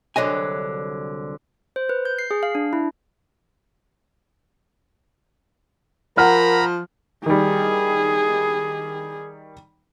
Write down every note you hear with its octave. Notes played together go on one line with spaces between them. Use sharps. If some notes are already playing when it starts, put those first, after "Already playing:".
C2 D3 F#3 D#5 G#5
C5
B4
G6
C7
G#4
F5
D4
E4
F3 A#4 F#5 A#5 B5 F6
D#3 G3 G#4